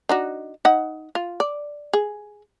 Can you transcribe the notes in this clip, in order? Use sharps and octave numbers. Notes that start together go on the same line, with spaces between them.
D4 D#4 F#4
D#4 F#5
F4
D5
G#4